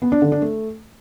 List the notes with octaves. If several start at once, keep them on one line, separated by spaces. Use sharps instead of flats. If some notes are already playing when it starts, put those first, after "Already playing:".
B3
D4
D3
D4
A3